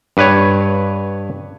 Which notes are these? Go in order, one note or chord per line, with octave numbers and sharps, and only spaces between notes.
G2 B4 C#5